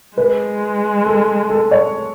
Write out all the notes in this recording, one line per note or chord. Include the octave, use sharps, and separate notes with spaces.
G#3 B4
A4
A4
C#5